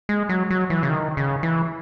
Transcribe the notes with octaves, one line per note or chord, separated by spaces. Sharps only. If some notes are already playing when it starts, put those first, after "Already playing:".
G#3
F#3
F#3
E3
C#3
D#3
C#3
E3